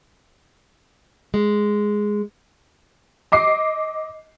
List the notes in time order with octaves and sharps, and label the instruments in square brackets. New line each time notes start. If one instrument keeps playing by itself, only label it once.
[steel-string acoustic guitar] G#3
[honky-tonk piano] D#5 D6 C7